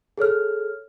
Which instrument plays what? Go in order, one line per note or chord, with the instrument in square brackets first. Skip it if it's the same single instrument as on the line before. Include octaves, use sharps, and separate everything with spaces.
[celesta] G#4 A4 C#5 F6